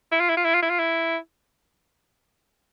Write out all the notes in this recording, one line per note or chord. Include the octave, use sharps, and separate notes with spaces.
E4
F4
E4
F4
E4
F4
E4
F4
E4